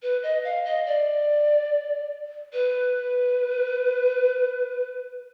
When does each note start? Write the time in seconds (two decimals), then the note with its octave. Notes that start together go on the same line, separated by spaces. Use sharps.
0.03 B4
0.23 D#5
0.44 F5
0.65 D#5
0.86 D5
2.53 B4